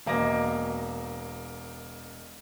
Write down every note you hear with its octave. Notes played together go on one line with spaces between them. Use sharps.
E1 A#3 D#5 D6 A#6